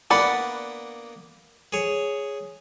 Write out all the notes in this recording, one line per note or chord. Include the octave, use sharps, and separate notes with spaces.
A#3 B3 D4 D5 F#5 B5
G#4 C#5